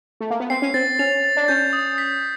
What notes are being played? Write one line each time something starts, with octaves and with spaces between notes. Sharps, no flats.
A3
A#3
B3
C4 C7
C#4
C4 A6
C#4 F7
A6
D4
C#4 G6
D#6
B6